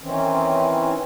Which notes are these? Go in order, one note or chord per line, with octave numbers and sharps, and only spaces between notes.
D#3 E3 C4 C#4